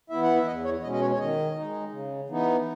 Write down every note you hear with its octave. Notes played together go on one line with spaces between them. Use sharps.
E3 B3 E4 E5
F#5
E5
E2 D#5
C#5
B2 G#3 C#4 D#5
D#5
C#5
C#5
D#3 D#5
G#3 D#4
C#3
E3 B3 D#4